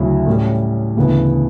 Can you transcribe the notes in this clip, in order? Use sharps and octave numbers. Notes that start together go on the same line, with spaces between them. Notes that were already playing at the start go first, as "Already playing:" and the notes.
Already playing: D2 C#3 F#3 C#4 E4
A2 G3 C#4 G4
D2 C#3 E3 B3